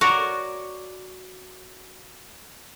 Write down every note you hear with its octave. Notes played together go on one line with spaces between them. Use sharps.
F#4 A#4 C#5 D5